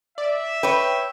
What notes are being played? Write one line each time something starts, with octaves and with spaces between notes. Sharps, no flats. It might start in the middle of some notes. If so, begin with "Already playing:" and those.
D5 E5
B4 C#5 G5